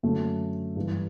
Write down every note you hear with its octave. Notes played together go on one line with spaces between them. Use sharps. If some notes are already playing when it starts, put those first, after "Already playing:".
F#2 D3 A3
G2 E3